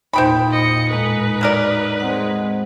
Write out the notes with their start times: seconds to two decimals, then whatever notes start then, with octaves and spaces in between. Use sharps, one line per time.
0.13 E2 A#2 D#4 C5 G5 B5
0.51 D#5 C#7
0.90 A2 G#3 D#4 B4
1.41 F#3 A#4 D5
2.00 G#3 C4 F#5